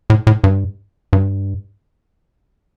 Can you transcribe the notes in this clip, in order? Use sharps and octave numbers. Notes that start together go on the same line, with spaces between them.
A2
A2
G2
G2